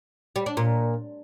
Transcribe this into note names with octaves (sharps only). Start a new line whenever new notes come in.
G3
D4
A#2